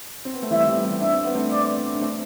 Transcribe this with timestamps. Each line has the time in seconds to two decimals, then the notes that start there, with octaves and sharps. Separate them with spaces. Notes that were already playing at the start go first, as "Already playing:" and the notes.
0.25 C4
0.33 B3
0.43 A3
0.51 E3 G3 E5
0.67 E3 G3
0.84 G3 B3
1.01 D4 E5
1.12 C4
1.24 B3
1.35 A3 C4
1.51 D5
1.95 D4
2.01 A3 C4